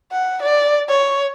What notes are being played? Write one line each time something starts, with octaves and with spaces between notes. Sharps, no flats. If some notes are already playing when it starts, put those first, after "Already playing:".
F#5
D5
C#5